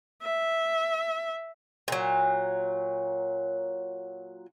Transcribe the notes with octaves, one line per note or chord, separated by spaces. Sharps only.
E5
A#2 F#3